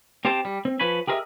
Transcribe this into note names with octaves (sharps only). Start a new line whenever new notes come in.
C4 G4 C5 G5 A5
G3
C4
F3 B4 C#5 G#5 B5
G4 G#4 A#4 B4 D#5 E5